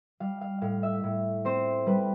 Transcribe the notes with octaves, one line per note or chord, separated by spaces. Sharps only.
G3 F5
F5
A2 F5
E5
A2
C4 C5
G3 B4